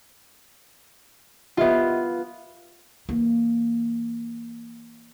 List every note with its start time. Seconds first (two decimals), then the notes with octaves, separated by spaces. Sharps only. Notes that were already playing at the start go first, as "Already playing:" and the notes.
1.57 B3 F4 G4 D#5 E5
3.09 E3 A#3